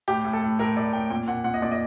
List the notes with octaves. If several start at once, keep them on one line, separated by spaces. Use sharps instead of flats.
A2 G4
A2
A4
A2
A2 A#4
A2 D5
A2 G5
A#2 G5
A#2 F#5
A#2 F#5
D#5
A#2 D5
D#5